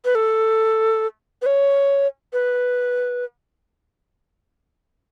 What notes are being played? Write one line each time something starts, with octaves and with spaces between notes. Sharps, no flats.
B4
A4
B4
C#5
B4